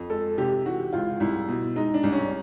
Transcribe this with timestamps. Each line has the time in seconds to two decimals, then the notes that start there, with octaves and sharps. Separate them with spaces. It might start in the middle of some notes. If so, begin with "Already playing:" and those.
Already playing: F2
0.10 G#3 A4
0.38 C3 G4
0.66 E3 F#4
0.93 C#2 F4
1.20 C2 E4
1.49 B2
1.76 G#3 D#4
1.94 D4
2.03 C2
2.13 C#4